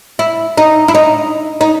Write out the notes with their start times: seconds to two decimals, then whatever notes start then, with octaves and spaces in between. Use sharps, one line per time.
0.19 E4
0.58 D#4
0.88 E4
0.95 D#4
1.61 D#4